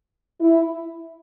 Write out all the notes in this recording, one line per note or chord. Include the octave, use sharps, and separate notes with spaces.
E4